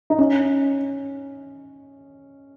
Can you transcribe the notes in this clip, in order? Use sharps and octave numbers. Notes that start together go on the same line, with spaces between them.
D#4
C#4